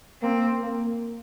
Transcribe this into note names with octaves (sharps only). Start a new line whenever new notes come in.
A#3 C4
A#3